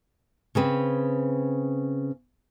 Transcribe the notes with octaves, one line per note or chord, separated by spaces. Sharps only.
C#3 C4 B4